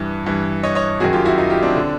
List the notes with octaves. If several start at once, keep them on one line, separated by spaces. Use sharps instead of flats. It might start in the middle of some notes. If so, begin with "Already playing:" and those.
Already playing: G2 E3
G2 E3
C#5 D#5
C#5 D#5
F#2 D#3 F#4 G#4
F4 G4
E4 F#4
D#4 F4
F4 G4
C4 D4
D3